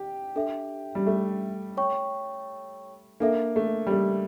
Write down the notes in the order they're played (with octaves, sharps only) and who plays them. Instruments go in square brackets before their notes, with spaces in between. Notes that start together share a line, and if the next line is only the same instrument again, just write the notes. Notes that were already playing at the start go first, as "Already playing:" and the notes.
Already playing: [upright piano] G4
[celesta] D4 A4 E5
[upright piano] G3
A3
[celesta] C#5 G5 C#6
[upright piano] A#3 [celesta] D4 A4 E5
[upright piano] A3
G3
A3